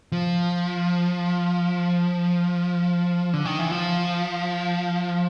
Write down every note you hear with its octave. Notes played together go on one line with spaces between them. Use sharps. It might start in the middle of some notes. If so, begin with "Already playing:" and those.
F3
D3
D#3
E3
F3